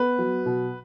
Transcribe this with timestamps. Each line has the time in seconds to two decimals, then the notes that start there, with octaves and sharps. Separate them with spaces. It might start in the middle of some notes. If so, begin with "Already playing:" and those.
Already playing: B3 B4
0.19 F#3
0.46 B2